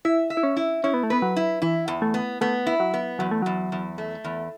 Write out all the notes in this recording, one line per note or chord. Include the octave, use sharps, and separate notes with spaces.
E4 E5
E5
E4
C#4
E4
C#4 E4
B3
A3
B3 B4
F#3
E4
E3 E4
E2
A3
B3
A3 B3
E4
F#3
B3
E2 F#3
A3
E2 F#3
E2
A3
E2